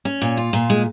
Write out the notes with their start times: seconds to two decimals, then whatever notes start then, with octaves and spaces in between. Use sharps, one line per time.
0.05 C#4
0.22 A#2
0.37 F4
0.53 A#2
0.70 G#3